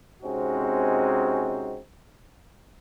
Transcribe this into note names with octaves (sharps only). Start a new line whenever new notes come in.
C3 G#3 C4 C#4 D#4 F#4